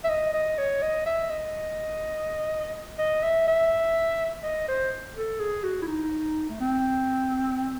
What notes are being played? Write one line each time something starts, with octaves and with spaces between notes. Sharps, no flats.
E5
D#5
D#5
C#5
D#5
E5
D#5
D#5
E5
E5
D#5
C5
A4
G#4
F#4
E4
D#4
A3
C4